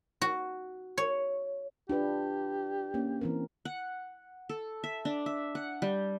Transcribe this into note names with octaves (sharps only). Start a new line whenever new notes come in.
F#4
C#5
D4 F4 G4 B4
A#3 C#4
E3 C4 A#4
F#5
A4
E5
D4
E5
F#5
G3